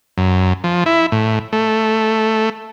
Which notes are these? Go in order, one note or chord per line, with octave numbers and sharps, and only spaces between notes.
F#2
F3
E4
A2
A3